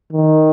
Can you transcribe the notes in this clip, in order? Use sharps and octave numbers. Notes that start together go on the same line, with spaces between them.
D#3